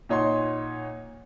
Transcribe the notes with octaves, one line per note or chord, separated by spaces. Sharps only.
A#2 D#4 C#5 F#5 C6